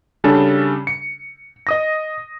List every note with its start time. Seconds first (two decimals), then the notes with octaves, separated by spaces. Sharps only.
0.24 C#3 G3 C#4 D4 A4
0.87 C#7
1.67 D#5 D#6 A#6